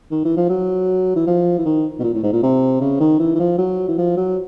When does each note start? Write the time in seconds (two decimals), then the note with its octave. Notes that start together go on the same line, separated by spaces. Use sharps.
0.11 D#3
0.25 E3
0.37 F3
0.49 F#3
1.16 E3
1.27 F3
1.58 E3
1.65 D#3
2.00 B2
2.04 A#2
2.14 A2
2.23 G#2
2.33 A#2
2.43 C3
2.81 C#3
3.00 D#3
3.19 E3
3.35 E3
3.39 F3
3.58 F#3
3.88 E3
3.98 F3
4.17 F#3